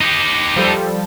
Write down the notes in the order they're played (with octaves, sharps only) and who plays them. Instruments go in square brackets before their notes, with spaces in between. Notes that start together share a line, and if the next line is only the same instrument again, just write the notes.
[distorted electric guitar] D#4 G4
[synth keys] F3 G3 A4